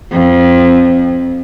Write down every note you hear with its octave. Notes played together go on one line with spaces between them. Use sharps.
F2